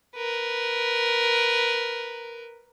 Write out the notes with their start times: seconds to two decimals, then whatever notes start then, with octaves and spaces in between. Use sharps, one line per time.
0.16 A#4 B4